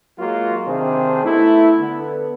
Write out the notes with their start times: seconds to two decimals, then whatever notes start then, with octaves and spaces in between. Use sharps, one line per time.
0.19 F#3 G#3 A#3 F4 F#4
0.67 C3 D#3 D4 G#4 C5
1.24 A3 B3 E4
1.79 D3 B3